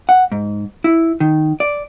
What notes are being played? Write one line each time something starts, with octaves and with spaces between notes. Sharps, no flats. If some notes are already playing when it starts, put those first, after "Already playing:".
F#5
G#2
E4
D#3
D5